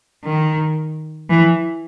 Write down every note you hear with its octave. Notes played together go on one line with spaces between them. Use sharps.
D#3
E3